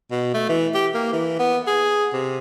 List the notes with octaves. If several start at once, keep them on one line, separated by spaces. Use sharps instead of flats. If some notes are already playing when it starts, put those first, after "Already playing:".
B2
A3
E3
G4
A#3
E3
B3
G#4
C3